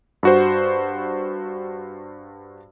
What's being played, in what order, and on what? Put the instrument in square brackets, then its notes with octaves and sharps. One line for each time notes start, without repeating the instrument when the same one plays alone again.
[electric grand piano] G2 F#4 C5